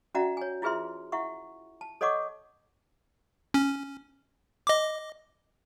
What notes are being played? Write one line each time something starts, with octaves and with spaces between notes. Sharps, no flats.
C#4 F#4 D5 E5 F#5 A#5
C#5 G#5
E4 F4 G#4 B4 E5 C6
E4 E5 F#5 C#6
A5
A4 C#5 D#5 F#5 C#6 D6
C#4
D#5 D6